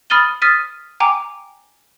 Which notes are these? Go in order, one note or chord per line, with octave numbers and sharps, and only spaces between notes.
B5 D#6 F6 A6 D#7 G7
D#6 F6 A6 B6 D#7
G5 G#5 A#5 D6